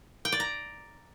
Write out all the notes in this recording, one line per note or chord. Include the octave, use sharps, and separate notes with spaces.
G5
D5
A#5